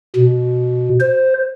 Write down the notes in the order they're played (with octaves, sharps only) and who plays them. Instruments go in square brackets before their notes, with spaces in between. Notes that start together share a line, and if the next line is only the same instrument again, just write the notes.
[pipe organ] B2
C5